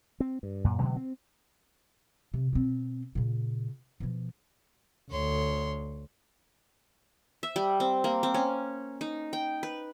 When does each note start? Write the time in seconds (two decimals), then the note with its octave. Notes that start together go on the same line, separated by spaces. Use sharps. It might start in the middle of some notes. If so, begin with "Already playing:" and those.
0.20 C4
0.43 G2
0.64 F#2 A#2
0.79 B2 D3 F#3 G#3
0.96 C4
2.34 C3
2.53 B2 C4
3.15 A#2 C#3
4.00 B2 F3
5.10 D2 C#5 C6
7.43 E5
7.56 G3
7.80 C4
8.04 A#3
8.23 C4
8.34 C#4
9.01 D#4
9.33 G5
9.63 B4